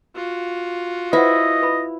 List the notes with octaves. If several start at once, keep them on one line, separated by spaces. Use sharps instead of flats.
F4 F#4
E4 B4 C5 D#5 F#5
B4 B5